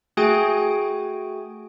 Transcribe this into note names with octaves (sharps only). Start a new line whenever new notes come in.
A3 F#4 G#4 G5 G#5